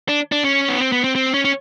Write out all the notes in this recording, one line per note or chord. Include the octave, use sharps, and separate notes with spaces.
D4
D4
C#4
B3
C4
B3
C4
C4
C#4
C#4